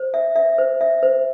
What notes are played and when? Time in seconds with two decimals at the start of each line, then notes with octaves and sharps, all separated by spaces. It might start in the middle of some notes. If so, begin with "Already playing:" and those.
Already playing: C5
0.14 E5
0.36 E5
0.58 C5
0.81 E5
1.03 C5